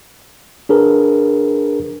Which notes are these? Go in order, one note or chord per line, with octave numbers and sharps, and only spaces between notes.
D4 G#4 A#4 B4